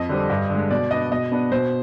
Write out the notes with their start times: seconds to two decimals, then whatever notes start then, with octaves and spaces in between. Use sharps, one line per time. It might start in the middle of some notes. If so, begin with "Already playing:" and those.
Already playing: F2 D#5
0.09 D3 G3 C4
0.30 G2
0.50 D3 G#3
0.71 B2 D5
0.91 B3 D4 D#5
1.11 B2 D#5
1.32 B3 D4
1.52 B2 C5